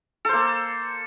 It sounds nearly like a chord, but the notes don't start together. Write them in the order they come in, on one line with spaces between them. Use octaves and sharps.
A4 C5 A#3